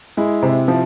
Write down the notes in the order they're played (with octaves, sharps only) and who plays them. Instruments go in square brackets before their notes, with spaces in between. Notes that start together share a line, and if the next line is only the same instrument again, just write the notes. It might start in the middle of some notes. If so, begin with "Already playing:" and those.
[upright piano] G#3 [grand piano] E4
[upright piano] C3
F3